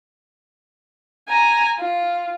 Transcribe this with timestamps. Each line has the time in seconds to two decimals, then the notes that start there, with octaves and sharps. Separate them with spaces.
1.29 G#5 A#5
1.78 F4